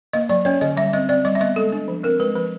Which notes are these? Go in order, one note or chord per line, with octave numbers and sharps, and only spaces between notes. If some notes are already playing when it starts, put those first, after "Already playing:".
A#3 D#5
F#3 D5
C#4 C#5
D3 D#5
G3 E5
C4 D#5
C4 D5
G3 D#5
E5
B3 D#5
G#3 A4
D4
F3
C4 A#4
G#3 B4
F3 B4